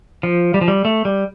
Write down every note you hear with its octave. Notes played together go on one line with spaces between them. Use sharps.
F3
G3
F3
G3
A3
G3